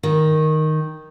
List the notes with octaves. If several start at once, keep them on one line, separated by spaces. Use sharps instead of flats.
D#3